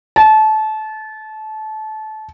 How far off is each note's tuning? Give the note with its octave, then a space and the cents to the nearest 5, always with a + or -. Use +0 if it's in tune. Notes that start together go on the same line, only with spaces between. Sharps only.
A5 -25